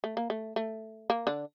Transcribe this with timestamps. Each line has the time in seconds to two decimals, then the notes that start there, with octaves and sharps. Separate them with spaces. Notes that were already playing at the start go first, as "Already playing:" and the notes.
0.04 A3
0.17 A#3
0.30 A3
0.56 A3
1.10 A#3
1.27 D3 D4